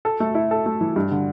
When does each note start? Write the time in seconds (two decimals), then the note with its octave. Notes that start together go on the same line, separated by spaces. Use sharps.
0.05 A4
0.20 A3
0.35 E4
0.51 A4
0.66 A3
0.81 E3
0.96 G2
1.11 D3